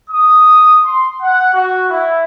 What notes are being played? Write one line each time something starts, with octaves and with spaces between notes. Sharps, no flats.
D#6
C6
F#5
F#4
E4